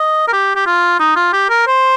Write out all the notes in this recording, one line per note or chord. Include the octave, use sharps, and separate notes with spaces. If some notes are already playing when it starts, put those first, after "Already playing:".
Already playing: D#5
A#4
G4
G4
F4
D#4
F4
G4
A#4
C5